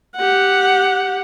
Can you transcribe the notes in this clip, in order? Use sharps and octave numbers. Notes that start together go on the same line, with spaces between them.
G4 F#5